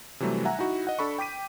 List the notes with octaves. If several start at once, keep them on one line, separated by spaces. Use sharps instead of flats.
C3 E3 F#3 G3 A3
E5 F#5 G#5 A#5
D#4 E4 F#4
D#5 F#5
D4 A4 B5 C#6
G5 D6 B6 D#7